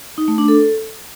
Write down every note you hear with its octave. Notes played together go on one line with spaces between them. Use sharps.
D#4
A3
D4
A4